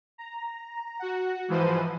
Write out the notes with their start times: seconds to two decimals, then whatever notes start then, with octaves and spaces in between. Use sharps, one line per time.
0.18 A#5
0.99 F#4 F#5
1.48 G#2 E3 F3 B4 C5 D#7